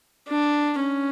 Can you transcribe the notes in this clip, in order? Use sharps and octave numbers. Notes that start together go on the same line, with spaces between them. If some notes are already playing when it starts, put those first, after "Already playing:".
D4
C#4